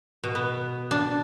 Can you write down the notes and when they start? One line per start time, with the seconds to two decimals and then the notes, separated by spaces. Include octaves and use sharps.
0.24 B2
0.35 B3
0.91 D4